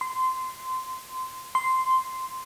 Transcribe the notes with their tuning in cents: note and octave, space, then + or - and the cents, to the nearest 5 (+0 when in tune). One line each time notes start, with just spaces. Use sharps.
C6 -20
C6 -10